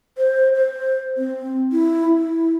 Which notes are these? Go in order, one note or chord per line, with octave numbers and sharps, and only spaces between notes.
C5
C5
C4
E4
E4